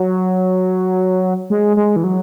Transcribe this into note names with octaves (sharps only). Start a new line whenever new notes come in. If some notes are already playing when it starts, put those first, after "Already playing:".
Already playing: F#3
G#3
G#3
E3
F#3